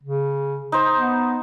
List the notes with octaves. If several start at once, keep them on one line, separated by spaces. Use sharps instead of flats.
C#3
D#4 C5
B3